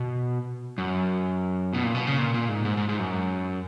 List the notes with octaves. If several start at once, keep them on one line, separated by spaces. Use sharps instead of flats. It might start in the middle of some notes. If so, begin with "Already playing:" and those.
Already playing: B2
F#2
B2
A#2
B2
C#3
A#2
A#2
G#2
G#2
G#2
G#2
F#2